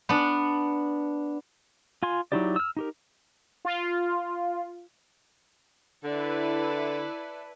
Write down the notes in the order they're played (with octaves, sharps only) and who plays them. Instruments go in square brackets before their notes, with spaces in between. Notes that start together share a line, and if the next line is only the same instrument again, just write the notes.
[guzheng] B3 D4
[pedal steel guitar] F4 G#5 C6
F#3 D#4 E4 G4 D5
E6 F6
D#4 G4 A#4
[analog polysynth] F4
[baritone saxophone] D3 [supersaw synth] E4 B4 [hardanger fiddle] A4 D5